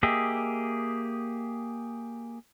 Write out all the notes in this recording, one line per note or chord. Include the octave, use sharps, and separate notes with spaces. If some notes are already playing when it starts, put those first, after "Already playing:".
A#3 G4 G#4 D#5 E5